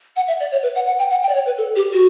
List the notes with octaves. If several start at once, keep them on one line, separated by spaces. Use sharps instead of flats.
F#5
E5
D5
C#5
B4
F#5
F#5
G5
F#5
G5
D5
C#5
B4
A4
G4
F#4